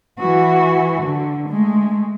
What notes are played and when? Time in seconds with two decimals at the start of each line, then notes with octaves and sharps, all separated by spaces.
0.19 E3 F#4
1.03 D3
1.49 G#3 A3